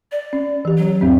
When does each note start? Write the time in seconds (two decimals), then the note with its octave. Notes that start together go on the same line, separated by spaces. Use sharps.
0.12 D5
0.33 C#4
0.65 E3 G4
0.77 F#3
1.01 E2 G#2 C4